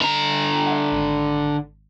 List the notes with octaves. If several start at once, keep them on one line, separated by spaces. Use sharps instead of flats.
D3 A#5
E5 F#5
G#1